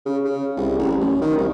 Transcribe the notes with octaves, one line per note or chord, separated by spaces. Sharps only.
C#3
C#3
C2
A1
F#2
D#3
C2